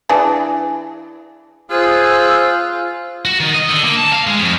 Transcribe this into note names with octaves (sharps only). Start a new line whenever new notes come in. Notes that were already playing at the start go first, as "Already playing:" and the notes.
E3 D4 G#4
F4 G#4 C5 E6 F#6
F#4
D#3
D#5
D3
A#3
A5
F5
G#3
F2